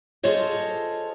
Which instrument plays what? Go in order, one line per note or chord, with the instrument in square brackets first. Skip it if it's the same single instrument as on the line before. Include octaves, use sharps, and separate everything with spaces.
[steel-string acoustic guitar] F4 G#4 A4 C5 C#5 D#5